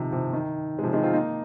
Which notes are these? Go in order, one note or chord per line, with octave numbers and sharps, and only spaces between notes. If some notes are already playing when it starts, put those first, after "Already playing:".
Already playing: C3 D#3 F3
C3 F3
D#3
G#3
C3 F3
D#3 G#3
C4 F4
A#3 D#4